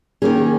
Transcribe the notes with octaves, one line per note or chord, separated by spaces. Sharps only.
D#3 A#3 C#4 G#4